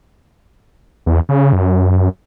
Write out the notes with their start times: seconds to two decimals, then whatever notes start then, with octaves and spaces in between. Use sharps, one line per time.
1.06 E2
1.29 C#3
1.53 F#2